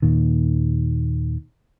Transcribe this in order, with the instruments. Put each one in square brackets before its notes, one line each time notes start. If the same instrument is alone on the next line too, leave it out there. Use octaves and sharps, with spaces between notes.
[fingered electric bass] D#2 A#2 D#3